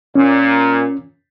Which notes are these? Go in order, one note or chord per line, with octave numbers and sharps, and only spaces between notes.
A#2 C#4